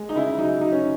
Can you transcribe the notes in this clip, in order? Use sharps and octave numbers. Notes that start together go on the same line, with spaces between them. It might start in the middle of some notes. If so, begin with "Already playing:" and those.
Already playing: G#3
D#4
C#3 E4
F#3 D#4
F#3 D#4
C#4